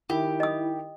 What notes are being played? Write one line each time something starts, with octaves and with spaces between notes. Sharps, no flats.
D#3 E4 G4
D#5 D#6